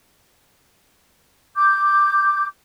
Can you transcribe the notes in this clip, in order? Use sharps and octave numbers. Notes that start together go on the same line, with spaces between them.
D6 G6